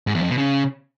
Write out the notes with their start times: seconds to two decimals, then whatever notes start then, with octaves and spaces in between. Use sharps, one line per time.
0.07 G#2
0.15 E2
0.22 F2
0.30 B2
0.38 C#3